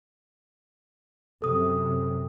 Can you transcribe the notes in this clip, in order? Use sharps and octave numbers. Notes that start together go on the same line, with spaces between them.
F#2 C3 A4 D#6